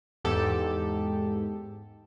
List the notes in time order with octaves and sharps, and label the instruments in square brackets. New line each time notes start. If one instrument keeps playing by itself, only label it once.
[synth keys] E2 G#2 G4 A4